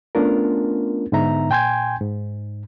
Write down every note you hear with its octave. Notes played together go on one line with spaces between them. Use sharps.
A3 B3 C#4 D4 F4 A#4
G#2 D3 B3 D#4 E5 A#5
A#2 G5 G#5 C6 G6 G#6
G#2